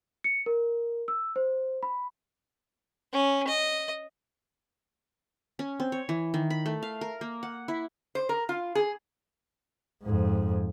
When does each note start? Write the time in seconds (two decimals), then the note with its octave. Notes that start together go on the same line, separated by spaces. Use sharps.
0.24 C#7
0.46 A#4
1.08 E6
1.36 C5
1.83 B5
3.13 C#4
3.47 D#5
5.59 C#4
5.80 C4
5.92 C#5
6.09 E3
6.34 D#3
6.50 B5
6.66 A3
6.82 F5
7.01 A#4
7.21 A#3
7.43 F#5
7.68 E4
8.15 C5
8.29 A#4
8.49 F4
8.75 G#4
10.03 F2 G#2